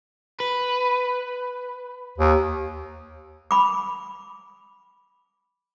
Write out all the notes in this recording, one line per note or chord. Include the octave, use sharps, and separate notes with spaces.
B4
D#2
B5 D6